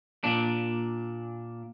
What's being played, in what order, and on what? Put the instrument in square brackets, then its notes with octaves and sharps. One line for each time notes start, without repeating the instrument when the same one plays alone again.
[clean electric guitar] A#2 D4